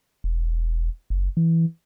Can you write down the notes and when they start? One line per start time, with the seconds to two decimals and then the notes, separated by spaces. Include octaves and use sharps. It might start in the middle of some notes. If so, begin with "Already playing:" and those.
0.24 E1
1.10 F#1
1.37 E3